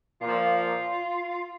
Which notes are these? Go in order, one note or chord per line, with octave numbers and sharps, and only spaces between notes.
A#2 F3 F4